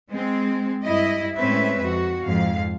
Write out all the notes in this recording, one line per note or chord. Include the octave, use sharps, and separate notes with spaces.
G#3 C4
G2 E4 D#5
A2 G#3 C4 C#4 B4 E5
F2 F#4
F2 G#2 F5